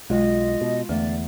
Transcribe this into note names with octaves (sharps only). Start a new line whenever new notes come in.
B1 G#3 F4 D#5
B2
E2 D3 A3 D5